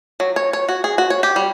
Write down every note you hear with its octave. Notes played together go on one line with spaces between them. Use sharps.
F#3
C#5
C#5
F#4
G#4
F#4
C#5
G4
G3